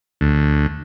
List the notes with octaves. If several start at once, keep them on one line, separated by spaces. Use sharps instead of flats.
D2